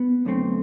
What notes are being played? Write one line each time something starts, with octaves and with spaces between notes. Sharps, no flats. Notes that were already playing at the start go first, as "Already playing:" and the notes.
Already playing: B3
F#2 D3 A3 C4